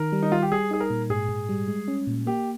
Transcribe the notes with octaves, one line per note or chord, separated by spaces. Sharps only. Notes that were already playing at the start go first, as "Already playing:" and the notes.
Already playing: D#3 A#4
G3
D#4
G3 F4
G4
G3 G#4
D#4 G#4
A#4
A#2
G#2 G#4
G#2
G3
G#3
C#4
A#2
A#3 G4